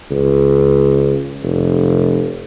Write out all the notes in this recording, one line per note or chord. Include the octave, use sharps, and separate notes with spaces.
C#2
F1